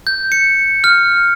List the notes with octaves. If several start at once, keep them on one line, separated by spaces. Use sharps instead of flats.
G6
C#7
F6